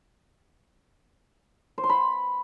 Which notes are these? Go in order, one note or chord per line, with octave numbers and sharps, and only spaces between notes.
C5
C6
B5